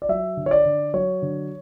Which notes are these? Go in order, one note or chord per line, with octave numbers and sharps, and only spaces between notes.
D5
F#3 E5
D3
C#5
D5
D3
F#3 C#5
D3